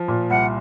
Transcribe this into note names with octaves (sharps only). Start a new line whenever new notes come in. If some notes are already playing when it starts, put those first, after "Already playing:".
Already playing: F3
A#2
C2 F#5